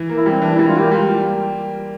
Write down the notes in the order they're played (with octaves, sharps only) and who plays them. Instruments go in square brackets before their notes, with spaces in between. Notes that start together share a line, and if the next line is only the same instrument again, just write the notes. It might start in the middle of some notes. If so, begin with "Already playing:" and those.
Already playing: [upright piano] E3
A#3
[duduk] E4
[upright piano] G3 [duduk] C4
[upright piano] E3 [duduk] D4
[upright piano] G3 [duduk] E4
[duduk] F4
[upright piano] A#3 [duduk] G4
[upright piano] G3 [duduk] F4